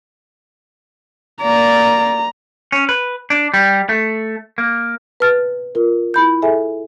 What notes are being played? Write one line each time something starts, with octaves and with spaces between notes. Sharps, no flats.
A#3 D5 A#5
C#4
B4
D4
G3
A3
A#3
B4 A5 F6 A6
F4 A#4
E4 B5 G6
G#4 A4 E5 G#5